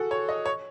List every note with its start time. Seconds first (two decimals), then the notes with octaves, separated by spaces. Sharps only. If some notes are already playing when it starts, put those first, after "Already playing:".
Already playing: F#4 G#4 A4
0.11 C#5
0.29 D#5
0.46 C#5